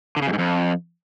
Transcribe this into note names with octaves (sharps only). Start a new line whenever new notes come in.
D3
C#3
F2
G#2
F2